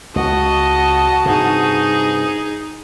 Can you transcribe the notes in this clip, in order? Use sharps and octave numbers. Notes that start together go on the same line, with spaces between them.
C#2 F#4 D#5 A5
G2 C3 D#4 G#4